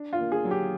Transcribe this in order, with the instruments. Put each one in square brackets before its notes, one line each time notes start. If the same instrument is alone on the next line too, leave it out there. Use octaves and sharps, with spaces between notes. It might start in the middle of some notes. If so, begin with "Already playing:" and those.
Already playing: [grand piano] D4
[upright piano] F4
[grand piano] A#3
[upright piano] G#4
[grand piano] F#3
[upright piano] G4